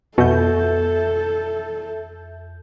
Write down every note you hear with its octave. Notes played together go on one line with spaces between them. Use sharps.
F2 B2 A4 E5 G6